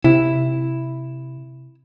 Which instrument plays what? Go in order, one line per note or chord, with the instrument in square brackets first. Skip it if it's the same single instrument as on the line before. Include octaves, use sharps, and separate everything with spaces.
[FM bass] C3 [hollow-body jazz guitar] E4